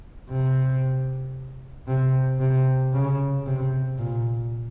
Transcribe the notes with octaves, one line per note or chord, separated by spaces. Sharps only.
C3
C3
C3
C#3
C3
A#2